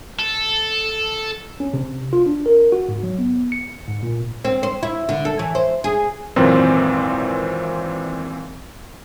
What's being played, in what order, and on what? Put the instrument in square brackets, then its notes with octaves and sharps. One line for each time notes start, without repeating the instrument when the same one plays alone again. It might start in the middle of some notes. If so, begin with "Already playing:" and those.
[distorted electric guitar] A4
[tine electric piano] C#4
C3
F4
D4
A#4
F#4
G#2
F#3
B3
C#7
G#2
A#2
[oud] C4
C5
E4
D3
A4
E3
C5
G#4
[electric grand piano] G#1 F#2 A#2 E3 C4